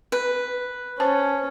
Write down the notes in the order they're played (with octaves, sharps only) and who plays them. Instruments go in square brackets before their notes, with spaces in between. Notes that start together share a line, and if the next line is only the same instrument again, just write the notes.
[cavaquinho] B4
[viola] C#4 [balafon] C5 A5